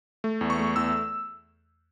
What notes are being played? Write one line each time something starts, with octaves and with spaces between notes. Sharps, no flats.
A3
E2
C#6
A3
E2 E6